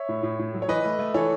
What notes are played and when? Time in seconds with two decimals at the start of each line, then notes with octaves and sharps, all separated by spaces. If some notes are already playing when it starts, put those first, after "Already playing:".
Already playing: C#5 E5
0.09 A2
0.23 A2
0.39 A2
0.54 F#3
0.62 C#5
0.68 E3 B4 D#5
0.84 A3
0.99 A3
1.14 E3 A4 C#5